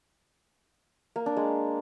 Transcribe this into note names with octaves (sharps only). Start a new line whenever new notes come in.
A#3
D4
G#3